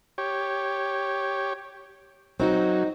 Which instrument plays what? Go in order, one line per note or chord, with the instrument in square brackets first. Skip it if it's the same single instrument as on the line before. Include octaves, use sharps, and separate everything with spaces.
[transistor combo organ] G4 C#5
[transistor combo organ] F#3 [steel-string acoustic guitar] C4 D#4 F#4